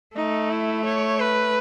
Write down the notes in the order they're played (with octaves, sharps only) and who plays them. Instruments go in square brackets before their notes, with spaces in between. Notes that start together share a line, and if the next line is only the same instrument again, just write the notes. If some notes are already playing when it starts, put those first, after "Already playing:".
[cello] A3 [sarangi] D#4
[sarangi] E4
C#5
B4